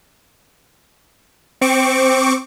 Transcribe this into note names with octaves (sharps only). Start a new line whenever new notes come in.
C4 C#6 D6